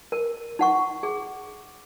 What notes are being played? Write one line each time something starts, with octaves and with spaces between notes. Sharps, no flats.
A#4
D#4 F#5 C#6
G#4